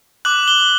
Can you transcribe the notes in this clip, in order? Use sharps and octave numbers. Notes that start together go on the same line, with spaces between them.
D6 F#6 F#7
G7